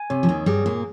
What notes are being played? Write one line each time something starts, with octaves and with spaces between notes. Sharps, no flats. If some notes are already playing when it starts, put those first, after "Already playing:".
Already playing: G#5
C3 C#5
F3
D#2 D#3
G2 G3 G#4
A#2 A#3